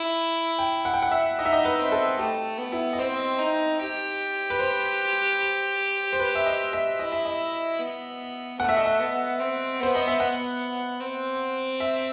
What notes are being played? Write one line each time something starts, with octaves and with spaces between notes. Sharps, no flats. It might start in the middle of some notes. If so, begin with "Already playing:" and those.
Already playing: E4
G5
F#5
G5
F#5
E5
D#4 D#5
E5
D#5
B4
C4
A4
A3 G4
B3
E4
D#5
C4 C5
D#4
G4
B4
C5
C5
B4
E5
D#5
E5
E4 D#5
E5
D#5
B3
A3 F#5
E5
D#5
E5
B3
C4
B3 C5
D#5
E5
B3 F#5
C4
E5